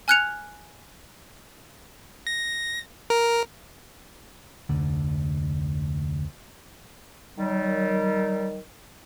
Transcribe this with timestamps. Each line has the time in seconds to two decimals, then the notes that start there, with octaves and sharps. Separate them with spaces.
0.08 G#5 F6 F#6 G#6 C#7 F7
2.27 A#6
3.10 A#4
4.69 F1 D2 D3
7.38 D#3 F#3 G3